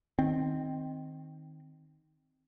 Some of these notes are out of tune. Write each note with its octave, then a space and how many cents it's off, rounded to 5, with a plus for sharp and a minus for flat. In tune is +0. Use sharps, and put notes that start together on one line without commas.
D#3 +0 C4 +0